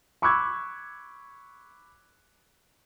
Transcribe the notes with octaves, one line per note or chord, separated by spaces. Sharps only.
B5 C#6 D6 E6 F#6 G#6